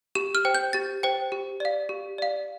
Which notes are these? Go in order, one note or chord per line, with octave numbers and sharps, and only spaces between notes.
G4 E7
F6
C5 G5
G6
G4 A6
C5 G5
G4
D5 F5
G4
D5 F5